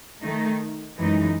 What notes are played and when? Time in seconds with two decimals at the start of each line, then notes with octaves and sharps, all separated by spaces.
0.22 D#3 A3 D#4
0.98 F#2 E3 G#3 D#4